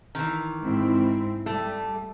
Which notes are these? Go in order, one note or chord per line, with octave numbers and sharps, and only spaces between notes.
D#3 E3
G#2 C4 E4
G3 A3